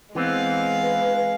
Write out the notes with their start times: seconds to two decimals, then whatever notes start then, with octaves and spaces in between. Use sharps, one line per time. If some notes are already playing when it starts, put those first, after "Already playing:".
0.15 E3 G#3 B3 C4 F5
0.81 B4